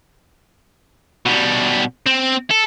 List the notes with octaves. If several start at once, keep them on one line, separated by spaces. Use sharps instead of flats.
B2 G3
C4
A4